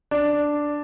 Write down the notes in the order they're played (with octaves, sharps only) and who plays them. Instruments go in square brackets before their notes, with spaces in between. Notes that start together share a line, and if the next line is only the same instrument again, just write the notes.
[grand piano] D4